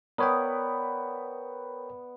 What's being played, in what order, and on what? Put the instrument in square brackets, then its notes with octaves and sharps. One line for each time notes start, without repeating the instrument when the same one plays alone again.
[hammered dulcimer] B3 D5 [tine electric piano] A#4 C#5 G5